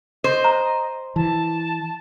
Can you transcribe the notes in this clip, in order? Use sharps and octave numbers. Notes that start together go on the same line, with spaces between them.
C5 D#5
A#5
E3 A5